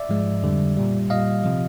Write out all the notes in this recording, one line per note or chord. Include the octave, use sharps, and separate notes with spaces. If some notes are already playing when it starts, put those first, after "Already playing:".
Already playing: D5 E5
G#2 F3 G#3
F2 D3 G3
A#2 G3
A#2 G3 D#5 F5
C3 F3